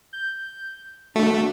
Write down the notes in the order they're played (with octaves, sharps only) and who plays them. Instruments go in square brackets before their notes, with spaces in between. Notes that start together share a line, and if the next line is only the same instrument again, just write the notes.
[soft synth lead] G6
[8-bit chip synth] A3 [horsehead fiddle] D4 [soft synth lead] F#4